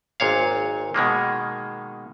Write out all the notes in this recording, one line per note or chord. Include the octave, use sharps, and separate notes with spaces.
G#1 A#2 C#5 F5
B2 D#3 G#3 A#3